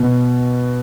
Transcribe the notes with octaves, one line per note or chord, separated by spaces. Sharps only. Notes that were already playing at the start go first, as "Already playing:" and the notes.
Already playing: B2